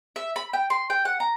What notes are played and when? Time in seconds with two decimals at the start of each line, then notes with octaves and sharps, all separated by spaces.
0.16 E5
0.36 B5
0.53 G5
0.70 C6
0.90 G5
1.05 F#5
1.20 A#5